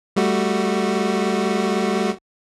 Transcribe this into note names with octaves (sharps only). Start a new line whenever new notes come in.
G3 A3 F#4